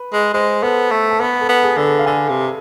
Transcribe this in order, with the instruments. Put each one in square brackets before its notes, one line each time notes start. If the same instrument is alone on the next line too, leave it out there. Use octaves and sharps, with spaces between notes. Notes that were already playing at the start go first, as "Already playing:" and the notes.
Already playing: [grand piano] B4
[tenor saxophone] G#3
[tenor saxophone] G#3 [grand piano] C5
[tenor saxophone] B3 [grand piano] A4
[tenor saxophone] A3
[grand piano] A4
[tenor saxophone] B3 [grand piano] B4
[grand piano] A4
[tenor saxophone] B3
[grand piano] G#4
[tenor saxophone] D3 [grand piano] B4
[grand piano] A4
F5
[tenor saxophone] D3 [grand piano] G#5
[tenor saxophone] C3